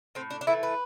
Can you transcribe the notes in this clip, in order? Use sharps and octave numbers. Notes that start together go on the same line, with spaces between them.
A2 C4
D4
D4
E3 A3 E4
B4